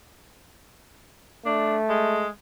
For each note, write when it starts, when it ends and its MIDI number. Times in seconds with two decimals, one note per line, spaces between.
1.45 2.30 57
1.45 1.77 62
1.89 2.29 56